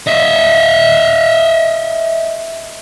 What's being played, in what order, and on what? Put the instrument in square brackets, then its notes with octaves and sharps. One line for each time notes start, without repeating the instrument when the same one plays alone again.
[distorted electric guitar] D#5 E5